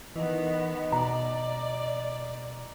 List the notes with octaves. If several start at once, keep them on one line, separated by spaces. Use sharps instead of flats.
D#3 E3 B3 D#5
B2 D5 A#5